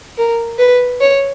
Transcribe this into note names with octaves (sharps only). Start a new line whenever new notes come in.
A#4
B4
C#5